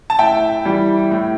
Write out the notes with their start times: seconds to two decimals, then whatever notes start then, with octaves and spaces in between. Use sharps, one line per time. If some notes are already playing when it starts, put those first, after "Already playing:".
0.10 A5
0.19 A2 E5 G5
0.65 E3 G3
1.11 A2